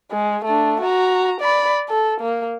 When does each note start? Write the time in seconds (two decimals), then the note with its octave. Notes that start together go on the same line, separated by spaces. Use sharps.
0.12 G#3
0.45 A3 D4
0.81 F#4 A#5
1.41 D5 B5
1.89 A4
2.21 A#3